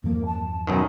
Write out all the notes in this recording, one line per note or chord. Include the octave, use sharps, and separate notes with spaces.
E2 G2 F3 A#3
A5
B1 F#2 D#3